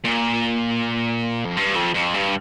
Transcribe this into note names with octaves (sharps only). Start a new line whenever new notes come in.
A#2
F2
G2
F2
F2
G2